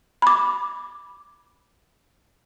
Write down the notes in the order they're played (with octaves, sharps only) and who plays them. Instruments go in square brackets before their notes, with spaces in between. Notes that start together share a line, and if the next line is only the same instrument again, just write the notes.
[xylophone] B5 D6